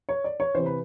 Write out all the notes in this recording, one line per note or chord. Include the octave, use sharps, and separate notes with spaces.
C#5
D5
C#5
C3 E3 C5
B4